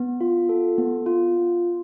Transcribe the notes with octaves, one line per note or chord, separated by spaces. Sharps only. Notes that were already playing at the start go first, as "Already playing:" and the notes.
Already playing: B3
F4
A4
B3
F4